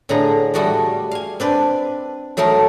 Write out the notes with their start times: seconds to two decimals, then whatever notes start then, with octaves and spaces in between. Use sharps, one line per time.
0.09 A2 D3 G#4 B4 A#5
0.54 G3 A3 F#4 D5 D#5
1.11 F5 G#5
1.40 C4 D4 B4
2.37 F#3 A3 D#4 A#4 F5